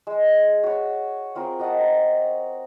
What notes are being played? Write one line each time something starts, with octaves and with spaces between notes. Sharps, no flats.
G#3
F#4 C#5
C4 F4 G#4 A#4
F#4 D#5 F#5 A5
A#5